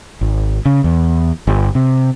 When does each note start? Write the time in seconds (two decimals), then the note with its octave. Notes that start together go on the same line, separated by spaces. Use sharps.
0.21 G#1
0.65 C#3
0.84 E2
1.47 G1
1.75 C3